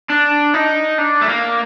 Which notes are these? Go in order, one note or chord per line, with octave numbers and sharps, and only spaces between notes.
D4
D#4
D4
A3
A#3